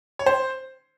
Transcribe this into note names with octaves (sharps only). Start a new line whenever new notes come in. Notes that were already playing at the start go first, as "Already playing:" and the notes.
C#5
C5